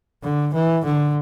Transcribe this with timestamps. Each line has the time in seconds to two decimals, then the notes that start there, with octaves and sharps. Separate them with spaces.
0.23 D3
0.54 E3
0.85 D3